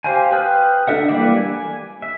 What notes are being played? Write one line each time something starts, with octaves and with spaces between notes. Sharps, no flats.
G4 C5 F5 G5 G#5
B4 G5 D#6 F6 G6
D4 A4 E5 F#5
E3 G3 A#3 D5 E5
G#5
E5